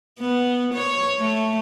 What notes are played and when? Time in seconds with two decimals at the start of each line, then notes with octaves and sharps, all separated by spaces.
0.20 B3
0.74 C#5
1.19 A3